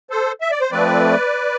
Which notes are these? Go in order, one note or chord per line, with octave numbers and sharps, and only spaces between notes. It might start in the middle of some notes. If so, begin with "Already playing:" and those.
A4 C5
E5
D5
C5
F3 A3 C4 B4 D5